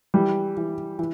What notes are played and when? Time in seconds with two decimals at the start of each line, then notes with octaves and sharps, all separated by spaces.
0.14 E3 G3 G4
0.57 E3
0.99 E3